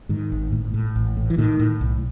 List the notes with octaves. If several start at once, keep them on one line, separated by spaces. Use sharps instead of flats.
G#2 D#3
G#1
A2
A2
A1
A2
E3
A2 D#3
A2
B1